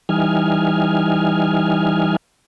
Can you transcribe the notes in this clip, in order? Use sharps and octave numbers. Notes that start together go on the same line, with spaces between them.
E3 G3 D#4 G#5 F6